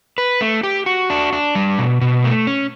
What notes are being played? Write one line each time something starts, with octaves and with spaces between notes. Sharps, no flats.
B4
A3
G4
F#4
D4
D4
G3
B2
B2
A3
C#4